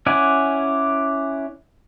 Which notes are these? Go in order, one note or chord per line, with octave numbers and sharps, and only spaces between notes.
C#4 E4 D5 F#5 G#5